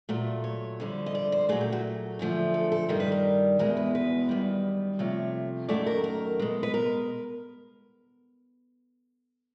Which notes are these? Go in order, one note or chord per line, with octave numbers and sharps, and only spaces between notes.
A#2 F#3 A3
C#5
F2 D3 G3
D#5
D5
C5
A#2 F#3 A3 G#4
G4
F#4
F#2 D3 F3 A3
A4
A4
G2 D#3 G3 A#4
B4
A#4
E2 B2 G#3 A#4
B4
B4
F#2 D#3 G3
C3 F3 A3 C#5
F#2 D#3 F#3 A3 D5
A#4
A#4
B2 G#3
B4
A#4